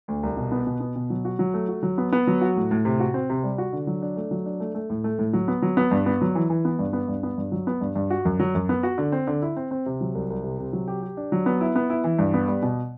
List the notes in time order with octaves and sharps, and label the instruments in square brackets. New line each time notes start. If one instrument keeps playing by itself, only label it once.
[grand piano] D2
C2
B2
B3
B2
B3
B2
F#3
F#4
F#3
A3
F#4
F#3
B3
B3
F#3
F#4
A2
A2
C3
F#4
C4
C3
G3
F#4
D3
F#3
D4
A3
F#3
D4
A3
A3
A2
A3
A2
F#3
B3
F#3
B3
G2
B3
F#3
E3
E3
B3
G2
B3
G2
B3
G2
F#3
B3
G2
G2
F#4
F#2
F#3
F#2
B3
F#4
D3
C4
D3
E4
C4
C4
C3
F#3
C2
C2
C3
C3
F#3
G4
G4
D4
F#3
B3
E4
B3
E4
E3
G2
B3
G3
B2